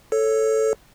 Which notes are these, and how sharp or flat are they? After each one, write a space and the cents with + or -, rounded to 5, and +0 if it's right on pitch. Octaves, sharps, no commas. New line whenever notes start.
A4 +0 C#5 +0